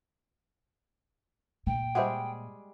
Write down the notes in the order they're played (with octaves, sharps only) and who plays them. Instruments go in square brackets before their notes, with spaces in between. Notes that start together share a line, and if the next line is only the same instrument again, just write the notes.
[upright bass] A#2 [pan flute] G5
[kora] G3 G#3 G#4 [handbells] C5 E5 F#5